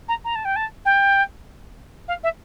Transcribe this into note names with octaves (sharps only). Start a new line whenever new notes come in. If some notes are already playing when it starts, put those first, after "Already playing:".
A#5
A#5
A5
G5
A5
G5
F5
E5